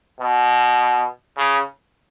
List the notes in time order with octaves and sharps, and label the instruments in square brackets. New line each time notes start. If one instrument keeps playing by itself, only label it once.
[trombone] B2
C#3